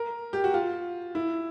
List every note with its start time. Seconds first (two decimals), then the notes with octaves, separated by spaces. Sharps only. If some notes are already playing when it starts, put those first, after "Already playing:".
Already playing: A#4
0.33 G4
0.44 F#4
0.54 F4
1.15 E4